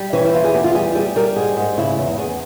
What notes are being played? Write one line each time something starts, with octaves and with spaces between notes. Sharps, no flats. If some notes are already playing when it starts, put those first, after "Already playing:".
Already playing: G3
E3 C#4
E4
E2 F4
G#4
E2 G4
F4
G3 G#4
G3 G#4
G3 A#4
G#2 G#4
G#2
C#3 E4
E2
E2 G#4